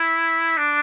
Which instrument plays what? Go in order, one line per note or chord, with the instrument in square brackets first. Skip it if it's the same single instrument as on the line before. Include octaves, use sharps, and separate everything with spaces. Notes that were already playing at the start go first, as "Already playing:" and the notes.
Already playing: [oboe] E4
D4